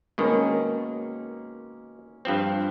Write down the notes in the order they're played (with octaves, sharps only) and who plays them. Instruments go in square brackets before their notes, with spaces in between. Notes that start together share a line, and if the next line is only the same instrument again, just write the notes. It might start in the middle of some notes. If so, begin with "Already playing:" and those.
[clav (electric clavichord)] B2 D#3 [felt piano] G#3 A#3 C#4
[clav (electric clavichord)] G2 F3 C4